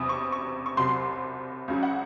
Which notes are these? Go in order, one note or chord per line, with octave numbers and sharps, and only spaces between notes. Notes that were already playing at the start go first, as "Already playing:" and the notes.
Already playing: E2 C3 F#3 D#6
C#6
C#6
C#6
C2 C3 F#3 C6
C#2 C#3 F#3
F#5